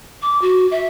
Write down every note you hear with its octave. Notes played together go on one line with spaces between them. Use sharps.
D6
F#4
E5